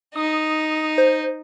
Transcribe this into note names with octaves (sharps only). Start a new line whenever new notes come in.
D#4 D#6
C5